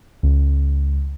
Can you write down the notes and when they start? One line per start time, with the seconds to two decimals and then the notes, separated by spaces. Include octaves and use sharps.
0.23 C#2